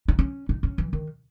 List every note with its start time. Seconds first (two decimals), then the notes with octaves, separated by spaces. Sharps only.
0.08 D#4
0.19 C#4
0.49 D#4
0.63 C#4
0.78 E3
0.93 D#3